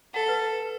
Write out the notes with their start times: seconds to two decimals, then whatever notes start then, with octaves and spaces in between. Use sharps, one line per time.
0.14 A4 F#5
0.28 B4